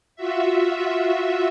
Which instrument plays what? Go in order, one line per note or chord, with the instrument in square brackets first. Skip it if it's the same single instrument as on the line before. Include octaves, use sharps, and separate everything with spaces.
[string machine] F4 F#4 E5